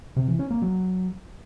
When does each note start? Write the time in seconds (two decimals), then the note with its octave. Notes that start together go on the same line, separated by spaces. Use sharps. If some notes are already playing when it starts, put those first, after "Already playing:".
0.16 C3
0.28 E3
0.39 C#4
0.51 A#3
0.62 F#3